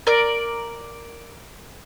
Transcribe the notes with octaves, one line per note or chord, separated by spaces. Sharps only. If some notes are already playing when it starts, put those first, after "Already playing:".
A#4 D5